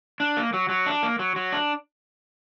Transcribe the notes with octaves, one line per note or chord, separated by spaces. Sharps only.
D4
A#3
F#3
F#3
D4
A#3
F#3
F#3
D4